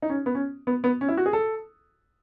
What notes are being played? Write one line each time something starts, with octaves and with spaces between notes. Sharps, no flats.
D#4
C#4
B3
C#4
B3
B3
C#4
E4
F#4
G#4
A4